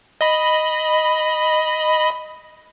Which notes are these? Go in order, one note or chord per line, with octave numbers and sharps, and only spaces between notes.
D#5 B5